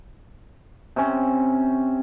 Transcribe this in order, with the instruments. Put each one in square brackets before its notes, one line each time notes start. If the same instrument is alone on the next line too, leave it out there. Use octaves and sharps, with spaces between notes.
[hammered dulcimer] C3 C#4